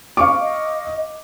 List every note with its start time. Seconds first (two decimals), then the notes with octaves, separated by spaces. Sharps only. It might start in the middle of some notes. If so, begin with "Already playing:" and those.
0.17 F5 C#6 D6
0.41 D#5